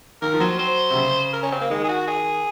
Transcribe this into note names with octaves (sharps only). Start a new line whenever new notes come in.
D#3 A#4
F3
F#3 C5
C5
C3
C#3
A#4
C#4
C4
A#3
D#3 G#3
G#4
F#4
G#4